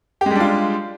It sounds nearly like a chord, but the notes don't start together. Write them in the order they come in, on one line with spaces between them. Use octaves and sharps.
G4 G#3 G3 D4 F4